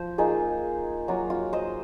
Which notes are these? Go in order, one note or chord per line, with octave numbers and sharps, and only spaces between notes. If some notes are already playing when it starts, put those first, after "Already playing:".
Already playing: F3 C5
A#3 D#4 F4 G#4
F#3 A#3 F4 F#4
F4
C5 D#5